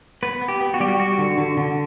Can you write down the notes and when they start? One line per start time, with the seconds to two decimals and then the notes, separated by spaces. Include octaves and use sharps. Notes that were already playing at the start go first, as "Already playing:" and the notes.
0.23 B3 B4
0.41 B3
0.48 G4
0.61 B3
0.74 F#4
0.80 G3 G4
0.88 F#4
0.99 G3 F#4
1.18 D3
1.38 D3
1.57 D3